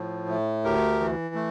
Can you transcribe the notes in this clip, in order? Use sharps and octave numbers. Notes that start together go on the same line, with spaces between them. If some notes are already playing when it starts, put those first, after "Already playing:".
Already playing: A2 F3
A3
D2 G4 A#4
E3
A3